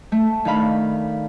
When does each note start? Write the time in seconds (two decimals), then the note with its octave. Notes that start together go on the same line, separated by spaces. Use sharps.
0.12 A3
0.45 D#3 D4 F5 B5